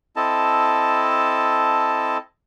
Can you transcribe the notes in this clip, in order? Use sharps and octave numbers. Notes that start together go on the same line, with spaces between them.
C4 E4 A4 D#5 A5